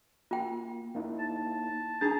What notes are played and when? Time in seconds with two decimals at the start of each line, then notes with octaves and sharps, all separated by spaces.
0.31 A#3 F4 G5
0.95 A#3 D#4 E4
1.19 A5
2.01 D4 D#4 G#4 A#5 A6